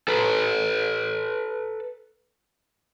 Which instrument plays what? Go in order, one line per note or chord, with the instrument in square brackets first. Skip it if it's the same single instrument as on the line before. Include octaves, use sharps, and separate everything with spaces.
[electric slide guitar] A4 B4